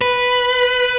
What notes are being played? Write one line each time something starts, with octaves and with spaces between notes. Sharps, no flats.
B4